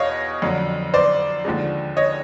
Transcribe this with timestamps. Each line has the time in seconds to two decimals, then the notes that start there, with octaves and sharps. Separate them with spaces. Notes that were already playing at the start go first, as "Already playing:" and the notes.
Already playing: E2 B2 C#5 D#5 F5
0.42 F2 D3 F#3
0.94 C5 D5
1.45 D#2 D3 F3 G#3
1.97 C#5 D#5